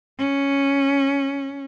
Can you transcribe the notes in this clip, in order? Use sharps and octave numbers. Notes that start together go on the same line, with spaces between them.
C#4